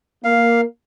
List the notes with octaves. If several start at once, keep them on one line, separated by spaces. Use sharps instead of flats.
A#3 F5